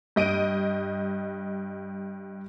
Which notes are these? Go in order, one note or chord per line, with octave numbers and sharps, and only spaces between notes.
G2 D#5 D7 D#7